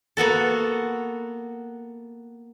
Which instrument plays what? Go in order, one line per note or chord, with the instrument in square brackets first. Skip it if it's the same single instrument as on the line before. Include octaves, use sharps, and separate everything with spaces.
[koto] A#3 B3 F#4 A4